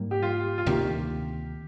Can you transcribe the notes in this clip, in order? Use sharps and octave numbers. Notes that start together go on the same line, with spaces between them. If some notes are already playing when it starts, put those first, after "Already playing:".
Already playing: G#2 G3 A#3
G4
F4
F4
D2 C3 D#3 A#3 G4